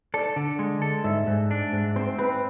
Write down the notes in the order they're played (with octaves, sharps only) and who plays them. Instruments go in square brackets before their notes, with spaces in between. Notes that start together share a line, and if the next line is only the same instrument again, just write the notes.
[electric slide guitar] A4 [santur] D5
[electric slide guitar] D3
G#3
A4
[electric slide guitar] G#2 [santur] E5
[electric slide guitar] G#2
D4
G#2
[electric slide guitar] C4 [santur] C5
[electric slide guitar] C4 [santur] B4